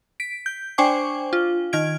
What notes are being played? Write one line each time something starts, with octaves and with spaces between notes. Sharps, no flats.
B6 D7
G6
D4 C5 G5 G#5 C#6 D6
F4
D#3 F6 G#6 D7